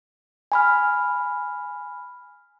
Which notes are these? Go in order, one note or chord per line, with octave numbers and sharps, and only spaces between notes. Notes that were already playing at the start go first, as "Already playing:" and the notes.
G#5 B5 F6